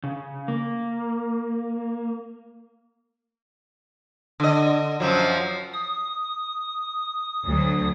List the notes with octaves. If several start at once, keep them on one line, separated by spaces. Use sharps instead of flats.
C#3
A#3
D3 D#5
F#2 F3 F#3
D#6
D2 F#3